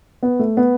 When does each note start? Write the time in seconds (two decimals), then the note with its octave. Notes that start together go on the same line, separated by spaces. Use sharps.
0.23 B3
0.39 A3
0.57 B3